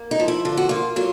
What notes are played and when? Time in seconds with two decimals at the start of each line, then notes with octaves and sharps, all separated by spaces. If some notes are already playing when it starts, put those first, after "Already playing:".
Already playing: A#3
0.11 D#4
0.20 F3
0.28 E4
0.45 D3 F4
0.57 F#4
0.69 A#3 F4
0.96 F#3 F4